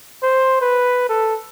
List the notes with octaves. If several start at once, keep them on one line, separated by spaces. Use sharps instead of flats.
C5
B4
A4